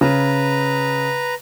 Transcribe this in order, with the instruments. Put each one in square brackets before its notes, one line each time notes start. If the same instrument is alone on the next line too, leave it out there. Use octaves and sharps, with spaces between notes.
[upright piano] C#3 [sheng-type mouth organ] B4 A#5